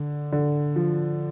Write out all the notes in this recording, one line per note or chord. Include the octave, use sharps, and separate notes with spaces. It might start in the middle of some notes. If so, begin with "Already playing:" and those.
Already playing: D3
D3
F3